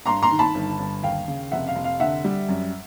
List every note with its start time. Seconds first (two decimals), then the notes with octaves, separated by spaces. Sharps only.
0.06 G2 A#5 C6
0.22 A#5 C6
0.31 D#3
0.39 A5 B5
0.55 G1
0.79 G1
1.03 D#2 F5 G5
1.28 C#3
1.52 F1 E5 F#5
1.68 F5
1.76 F1
1.84 F5
2.00 D3 E5 F#5
2.25 G3
2.49 F#2